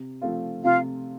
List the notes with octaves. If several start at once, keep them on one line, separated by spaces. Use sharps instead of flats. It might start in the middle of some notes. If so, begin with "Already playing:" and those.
Already playing: C3
F3 A3 C4 F4
C3 F4 F5